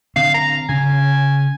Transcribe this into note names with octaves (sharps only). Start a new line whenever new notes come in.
D3 C4 F5
A#5
C#3 G#5